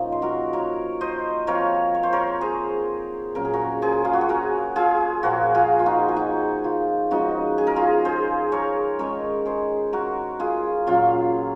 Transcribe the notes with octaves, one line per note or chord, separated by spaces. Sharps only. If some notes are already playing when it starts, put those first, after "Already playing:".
Already playing: A#2 F3 A#3 C#4 D#4
C5
F#4 A#4
A#4 C#5
C5 D#5
F3 C4 A#4 C#5
C#5
C5
A#4 C#5
G#4 C5
A#2 F#3 C#4 A#4
G#4
F#4 A#4
G#4 C5
F4
F#4
G#4
F#4 A#4
F4 G#4
A#2 F3 A#3 F#4 A#4
F4 G#4
F4
D#4 F#4
G#4
D#4 F#4
F4
F3 G#3 C#4 D#4 F#4
G#4
A#4
F4 G#4
G#4 C5
A#4 C#5
D#3 G#3 C#4 A#4 C#5
G#4 C5
F#4 A#4
F4 G#4
A#2 F#3 C#4 F4